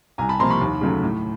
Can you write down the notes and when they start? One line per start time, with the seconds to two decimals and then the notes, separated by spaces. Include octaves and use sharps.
0.18 C2 G#5 A#5
0.29 A5 B5
0.39 C3 F3 A#3 A#5 C6
0.50 B5 C#6
0.61 D#2
0.81 C#3 F#3 A3
1.03 A2